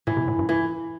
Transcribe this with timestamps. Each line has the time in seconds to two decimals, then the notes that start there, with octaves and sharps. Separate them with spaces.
0.07 A2 E3
0.17 C3
0.28 A2
0.39 G2
0.49 E3